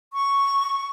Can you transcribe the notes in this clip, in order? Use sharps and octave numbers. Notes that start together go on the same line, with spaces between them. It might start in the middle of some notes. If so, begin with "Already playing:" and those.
C#6